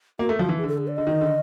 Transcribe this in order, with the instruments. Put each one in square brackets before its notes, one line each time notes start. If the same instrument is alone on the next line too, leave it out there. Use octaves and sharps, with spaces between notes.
[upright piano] A#3 [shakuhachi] F#4
[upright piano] A3
[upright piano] F3 [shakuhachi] F#4
[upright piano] E3
[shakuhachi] G#4
[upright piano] D3 [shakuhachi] A4
[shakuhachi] G#4
D5
[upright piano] D3 [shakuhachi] D#5
[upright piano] D#3
D3